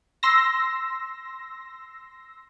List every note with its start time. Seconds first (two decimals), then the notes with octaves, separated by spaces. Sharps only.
0.23 C6 E6 A#6